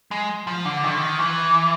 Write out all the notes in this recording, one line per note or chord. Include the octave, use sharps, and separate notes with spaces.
G#3
F3
D3
D#3
D3
D#3
E3